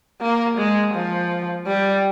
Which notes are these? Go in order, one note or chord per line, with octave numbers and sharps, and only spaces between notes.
A#3
G#3
F3
G3